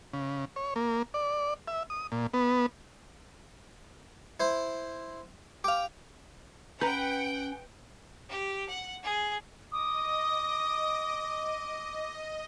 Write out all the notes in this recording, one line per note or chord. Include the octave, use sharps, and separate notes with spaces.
C#3
C#5
A#3
D5
E5
D#6
A#2
B3
E4 C5
G4 F5 D6
C#4 B4 F#5 G5 A#5 G6
G4
F#5
G#4
D#5 D6 D#6